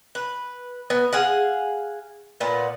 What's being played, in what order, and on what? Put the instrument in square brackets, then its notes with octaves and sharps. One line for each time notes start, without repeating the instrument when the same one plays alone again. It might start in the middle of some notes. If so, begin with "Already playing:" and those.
[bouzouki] B4
B3
G#4 F5 F#5
A#2 B3